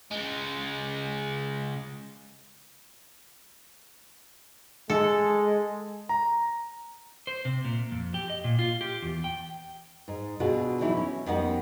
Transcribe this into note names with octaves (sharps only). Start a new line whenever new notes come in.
C#3 G#3
G#3 A4
A#5
C5
C3
A#2
F2
G4
D#5
A#2
F4
G4
E2
G5
G#2
B2 D3 F4 F#4 G#4
E3 F#3 D#4 E4
C#4
F2 G3 B3 D#4 A#4 F#5